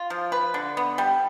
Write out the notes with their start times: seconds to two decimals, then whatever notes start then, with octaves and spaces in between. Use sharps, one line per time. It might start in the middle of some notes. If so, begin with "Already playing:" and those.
Already playing: F4
0.10 F3
0.32 B4
0.54 D3
0.77 B3
0.98 G3